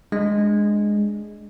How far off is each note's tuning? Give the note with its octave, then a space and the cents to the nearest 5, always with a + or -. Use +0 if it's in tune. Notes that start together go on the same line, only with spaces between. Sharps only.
G#3 +0 D4 +0